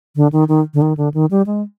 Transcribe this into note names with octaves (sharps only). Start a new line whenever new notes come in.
D3
D#3
D#3
D3
D#3
D3
D#3
G3
G#3